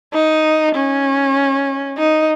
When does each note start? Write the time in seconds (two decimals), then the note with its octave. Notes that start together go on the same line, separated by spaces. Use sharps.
0.13 D#4
0.75 C#4
1.98 D#4